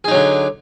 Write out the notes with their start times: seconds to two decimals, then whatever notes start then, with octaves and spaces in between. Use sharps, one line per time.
0.04 G#4
0.08 D#4
0.11 F#3
0.15 D3